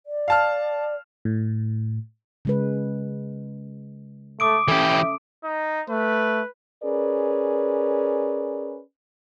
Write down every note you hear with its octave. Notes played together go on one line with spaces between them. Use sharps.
D5
F5 A5 F6
A2
C#3 G#3 B4
A3 D6 D#6 D7
E3 C#4 G4 A4 E5
D#4
A3 B4
C#4 G#4 A#4 B4 D5